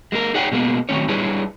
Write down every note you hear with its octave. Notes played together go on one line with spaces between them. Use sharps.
G#3 A#3 E4 A#4
D#4 G#4 C#5 D5 F#5 G5
B2 G#3 A#3 B3
D#3 F#3 A3 C4 C#4 C#5
G3 D4 E4 G#4 B4 C#5